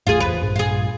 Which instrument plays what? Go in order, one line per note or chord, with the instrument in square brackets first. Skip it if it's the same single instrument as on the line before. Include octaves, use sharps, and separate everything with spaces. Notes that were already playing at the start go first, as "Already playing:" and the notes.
[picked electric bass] A1 E2 A3 [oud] F4 G#4
[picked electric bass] F#1 E2 [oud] B4
[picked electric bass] A#1 G2
[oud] F4 G#4